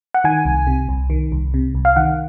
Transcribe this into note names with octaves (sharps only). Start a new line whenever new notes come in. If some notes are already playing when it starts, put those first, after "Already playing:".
F#5
D#3 G#5
C2
C3
C2
D#3
C2
C3
C2
F5
D#3 F#5